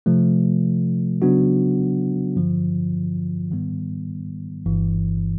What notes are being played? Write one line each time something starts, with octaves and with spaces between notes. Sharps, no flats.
C3 F3 A3
C#3 F#3 B3 D4 F#4
G2 D3 F3
G#2 D#3 G3 B3
G1 G2 E3